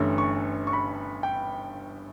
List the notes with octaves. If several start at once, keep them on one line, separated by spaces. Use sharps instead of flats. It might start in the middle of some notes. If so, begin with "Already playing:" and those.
Already playing: G1 G2 E3 A3 C#4
C#6
C#6
B5
G5